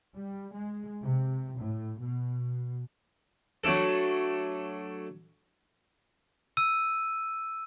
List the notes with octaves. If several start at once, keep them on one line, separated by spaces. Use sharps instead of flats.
G3
G#3
C3
A2
B2
F#3 A3 D4 A4
E6 D#7